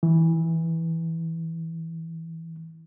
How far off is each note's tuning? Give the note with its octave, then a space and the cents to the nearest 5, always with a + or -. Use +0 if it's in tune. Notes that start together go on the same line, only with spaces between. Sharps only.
E3 -10